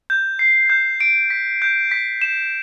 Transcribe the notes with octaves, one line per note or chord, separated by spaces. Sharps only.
G6
C7
G6
D7
B6
G6
B6
E7